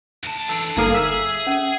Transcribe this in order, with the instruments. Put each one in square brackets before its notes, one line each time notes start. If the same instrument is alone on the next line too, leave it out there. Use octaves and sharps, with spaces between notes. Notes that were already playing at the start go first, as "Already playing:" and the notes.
[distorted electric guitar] D2 A5
[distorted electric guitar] E3 D4 [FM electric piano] A4
[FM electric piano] G1 A#3 F5 [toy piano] D#4 A4 [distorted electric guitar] G#4 G#5
[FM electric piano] E5
[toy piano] C#4